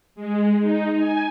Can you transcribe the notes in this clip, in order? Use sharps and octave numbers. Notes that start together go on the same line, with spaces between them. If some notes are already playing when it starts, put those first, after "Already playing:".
G#3
D#4
G#5